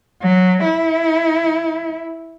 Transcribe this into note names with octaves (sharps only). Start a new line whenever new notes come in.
F#3
E4